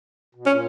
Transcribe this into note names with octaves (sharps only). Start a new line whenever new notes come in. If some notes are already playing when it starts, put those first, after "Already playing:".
B2
A#2 C#4